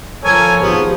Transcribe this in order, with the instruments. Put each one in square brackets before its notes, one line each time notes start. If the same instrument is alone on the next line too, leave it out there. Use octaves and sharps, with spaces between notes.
[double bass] F3 [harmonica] A4 A#4 G#5 [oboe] C#5
[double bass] G#1 F3 [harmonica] B3 [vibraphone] D#4 G4 G#4